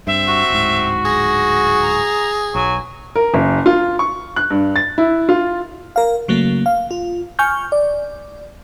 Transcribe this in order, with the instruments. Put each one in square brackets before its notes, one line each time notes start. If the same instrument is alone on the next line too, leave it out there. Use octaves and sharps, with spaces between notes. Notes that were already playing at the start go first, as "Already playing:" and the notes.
[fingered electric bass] G2 [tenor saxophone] C4 [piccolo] E5
[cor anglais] F#4
[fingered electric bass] D1 G#2
[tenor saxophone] G#4 [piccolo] A#6
[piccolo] A#5
[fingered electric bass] B1 [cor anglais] F#3 [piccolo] G#5
[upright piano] A#4
F#1
F4
C#6
F#6
G2
A6
E4
F4
[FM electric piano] A#4 F5
C#3 F#3 A3 A#3
F5
F4
G#5 C#6 F6 G6
D5